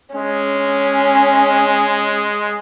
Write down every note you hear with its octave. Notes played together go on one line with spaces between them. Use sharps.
G#3 C#4